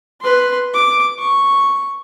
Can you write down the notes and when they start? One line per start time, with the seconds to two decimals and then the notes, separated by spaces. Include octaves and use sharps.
0.21 B4 C6
0.74 D6
1.19 C#6